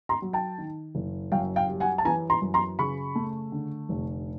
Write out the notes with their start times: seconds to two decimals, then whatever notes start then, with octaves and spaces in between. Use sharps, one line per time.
0.09 A#5 C6
0.22 F#3
0.33 G5 A5
0.58 D#3
0.95 F#1
1.32 F#2 F5 G5
1.56 F5 G5
1.68 G3
1.80 F#5 G#5
1.98 A5
2.05 E3 G#5 A#5
2.30 A#5 C6
2.42 F#2
2.54 A#5 C6
2.79 C#3 B5 C#6
3.15 A3
3.52 D3
3.89 F1